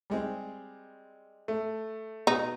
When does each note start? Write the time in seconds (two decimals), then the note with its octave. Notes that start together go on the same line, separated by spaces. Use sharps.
0.10 G3 G#3 C4
1.48 A3
2.27 B2 D#4